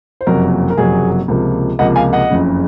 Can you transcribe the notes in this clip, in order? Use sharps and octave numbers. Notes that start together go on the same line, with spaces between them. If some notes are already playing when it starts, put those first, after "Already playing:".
C5
F#1 F2 C3 F#3 A#3 A#4
A#4
F#1 F2 C3 F#3 A#3 G#4
C#2 C3 F3 A#3
C#2 C3 F3 A#3 D#5 F#5
F5 G#5
D#5 F#5
F#1 F2 C#3